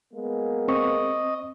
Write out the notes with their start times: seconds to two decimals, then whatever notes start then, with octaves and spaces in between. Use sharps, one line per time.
0.13 G#3 A#3 B3
0.68 C4 D#5 C#6